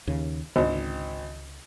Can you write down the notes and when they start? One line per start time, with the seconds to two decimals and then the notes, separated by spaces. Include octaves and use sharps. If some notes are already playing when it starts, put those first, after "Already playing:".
0.07 D#2 C#3
0.56 G#1 C#2 D3